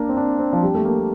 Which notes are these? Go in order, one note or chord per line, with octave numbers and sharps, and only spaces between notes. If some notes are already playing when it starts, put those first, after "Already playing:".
Already playing: A#3 D4
C4
D4
C4
F3
G3
A3
A#3